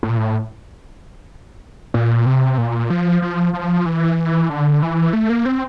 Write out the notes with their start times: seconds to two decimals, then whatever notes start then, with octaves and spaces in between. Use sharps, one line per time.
0.03 A2
0.10 A#2
0.17 A2
1.94 A#2
2.26 C3
2.58 A#2
2.90 F3
3.22 F3
3.53 F3
3.86 E3
4.50 D3
4.82 E3
5.13 A3
5.30 A#3
5.46 C4